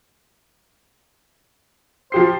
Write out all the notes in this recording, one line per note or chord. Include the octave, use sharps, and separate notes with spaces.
F3 G4 C5 C7